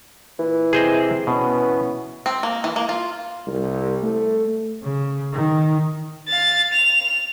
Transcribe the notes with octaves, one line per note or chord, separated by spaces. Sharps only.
A#2 E3
C3 C4 G#4 C5 D#5
B2 E3 B3 C#4
C4
A#3
E3
A#3
F4
C2
A3
C#3
D#3
F5 A6
F7